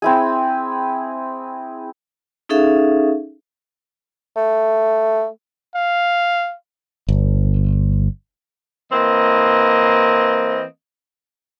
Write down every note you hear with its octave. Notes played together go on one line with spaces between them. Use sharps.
C4 E4 G#4
C#4 D#4 G#4 A4 E5 F5
A3
F5
G1
E3 A#3 C4 D#5